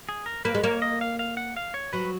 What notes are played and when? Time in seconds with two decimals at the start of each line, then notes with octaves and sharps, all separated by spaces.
0.09 G#4
0.26 A#4
0.45 A#3 B4
0.55 G#3
0.64 A#3 C#5
0.82 D#5
1.01 F5
1.19 F5
1.37 F#5
1.57 F5
1.74 C#5
1.93 F#3 B4